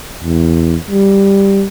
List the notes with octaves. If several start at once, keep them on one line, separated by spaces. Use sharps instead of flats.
E2
G3